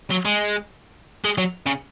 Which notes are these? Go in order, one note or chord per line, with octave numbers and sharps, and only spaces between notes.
F#3
G#3
G#3
F#3
C#3